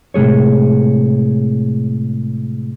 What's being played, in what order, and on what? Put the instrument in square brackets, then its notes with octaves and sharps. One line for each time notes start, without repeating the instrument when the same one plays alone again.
[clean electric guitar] A2 C3 G#3 G#4 C#5